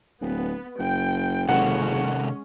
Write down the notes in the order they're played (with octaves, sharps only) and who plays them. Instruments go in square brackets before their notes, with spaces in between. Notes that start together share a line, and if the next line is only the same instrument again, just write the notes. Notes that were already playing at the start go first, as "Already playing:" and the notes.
[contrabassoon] D1 [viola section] B3
[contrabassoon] F#1 [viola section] G5
[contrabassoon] F#1 [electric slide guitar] C3 D#3 A4 [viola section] G#3 C#4 [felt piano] F#5